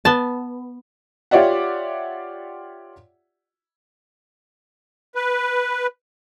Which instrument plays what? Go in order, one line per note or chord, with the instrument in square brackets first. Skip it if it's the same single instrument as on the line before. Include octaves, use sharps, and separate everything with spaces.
[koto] B3 A5
[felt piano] F4 G4 C#5 D5 E5 F#5
[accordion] B4